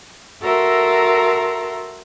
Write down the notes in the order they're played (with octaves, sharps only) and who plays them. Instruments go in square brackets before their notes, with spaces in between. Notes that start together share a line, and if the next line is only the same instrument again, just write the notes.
[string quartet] F#4 A4 A#4 E5 A#5 C6